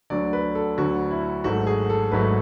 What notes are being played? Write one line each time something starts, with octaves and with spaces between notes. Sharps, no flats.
D2 D3 F#3 D5
B4
A4
D2 D3 F#3 F#4
E4
G#1 G#2 F#3 A3 F#4
G#4
A4
G#1 G#2 F#3 A3 B4